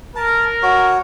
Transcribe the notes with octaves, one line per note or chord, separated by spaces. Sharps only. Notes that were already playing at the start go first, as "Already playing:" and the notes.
A#4 A5
F#4 C#5